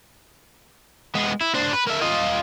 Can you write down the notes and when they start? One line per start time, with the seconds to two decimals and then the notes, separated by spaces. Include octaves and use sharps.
1.15 G#3 B3
1.41 E4
1.54 D4 C5
1.72 B4
1.87 A#3 E5
2.01 F4 D#5